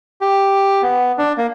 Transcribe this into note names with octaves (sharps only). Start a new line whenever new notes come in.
G4
B3
D4
A#3